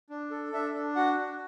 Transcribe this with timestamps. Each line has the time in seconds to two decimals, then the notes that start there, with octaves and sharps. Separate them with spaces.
0.10 D4
0.31 A4
0.53 D4 E5
0.74 D4
0.96 F#4 F#5
1.18 D4